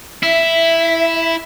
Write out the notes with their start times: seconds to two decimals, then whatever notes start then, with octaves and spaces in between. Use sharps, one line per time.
0.23 E4 E5